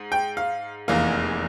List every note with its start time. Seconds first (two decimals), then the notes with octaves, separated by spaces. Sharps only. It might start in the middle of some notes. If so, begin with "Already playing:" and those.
Already playing: G#2
0.12 G5
0.37 F5
0.88 F1 E2 E3 A#3 F5